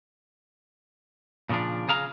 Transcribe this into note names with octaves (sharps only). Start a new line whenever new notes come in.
A#2 C#3 E3 F3 D4
C#3 G#4 F5 A#5